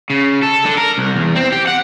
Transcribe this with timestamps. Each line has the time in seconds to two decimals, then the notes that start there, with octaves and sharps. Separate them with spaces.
0.10 C#3
0.43 A4
0.65 D3
0.77 A#4
0.98 C2
1.16 E2
1.36 C4
1.52 G4
1.67 F#5